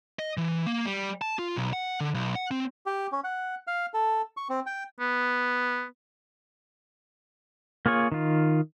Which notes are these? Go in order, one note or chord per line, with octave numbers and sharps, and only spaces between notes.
D#5
E3
A#3
G3
A5
F4
B1
F#5
D3
B1
F#5
C4
G4
C#4
F#5
F5
A4
C#6
C4
G5
B3
A#3 F4 G#4 C#5
D#3 F4